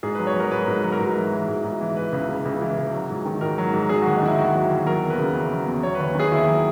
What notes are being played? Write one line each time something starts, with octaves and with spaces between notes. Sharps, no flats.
G#2 G#4
B4
F#3
C#5
F#3
A#4
G#2 B4
G#2
F#3
A#4
G#2 B4
E3
E3
G#2
G#2
E3
E3 B4
C#2
C#3
C#2
E3
C#2
F#3
G#2
D#3
G#2 A#4
F#3
G#2
F#3 G#4
F#4
D#2
D#4
D#3 E4
D#2 F#4
F#3
D#2
F#3 A#4
E2
B4
C#3
E2
F#3
E2
F#3 C#5
B4
D#2
D#3 G#4
D#2 E4
F#3